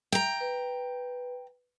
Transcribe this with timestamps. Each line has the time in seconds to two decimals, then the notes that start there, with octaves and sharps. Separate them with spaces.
0.12 G5 A#5
0.41 B4